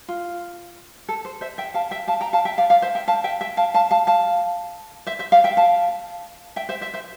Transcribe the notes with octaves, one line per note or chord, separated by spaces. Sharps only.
F4
A4
C5
C5 E5
E5 G5
F5 A5
E5 G5
F5 A5
G5 A#5
F5 A5
E5 G5
D5 F5
D5 F5
C5 E5
E5 G5
F5 A5
E5 G5
E5 G5
F5 A5
F5 A5
F5 A5
F5 A5
C5 E5
C5 E5
D5 F5
E5 G5
F5 A5
E5 G5
C5 E5
C5 E5
C5 E5